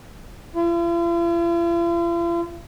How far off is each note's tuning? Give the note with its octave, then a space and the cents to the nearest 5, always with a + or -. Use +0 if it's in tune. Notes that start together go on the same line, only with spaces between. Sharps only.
F4 -45